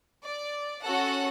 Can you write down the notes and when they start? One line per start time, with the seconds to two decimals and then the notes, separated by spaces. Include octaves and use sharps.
0.23 D5
0.83 C#4 F#4 A4 F#5